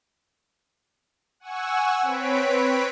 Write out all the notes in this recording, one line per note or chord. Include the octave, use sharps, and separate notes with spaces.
F#5 G#5 C#6 E6
C4 B4 C#5 B6 D7